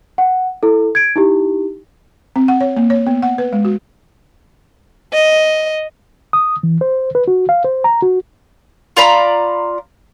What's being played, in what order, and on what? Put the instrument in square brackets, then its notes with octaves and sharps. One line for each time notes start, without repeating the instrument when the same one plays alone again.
[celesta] F#5
E4 A4
G#6 D7
D#4 E4 G4
[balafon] C4
F#5
C#5
A#3
C#5
B3
F#5
B4
G#3
F#4
[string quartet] D#5
[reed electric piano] D#6
E3
C5
B4
F#4
F5
C5
A#5
F#4
[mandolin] F4 D5 A#5 B5